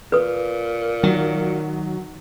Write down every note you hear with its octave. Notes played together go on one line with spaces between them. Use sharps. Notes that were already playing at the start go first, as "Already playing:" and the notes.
A#2 B4 D#6
D#3 F#3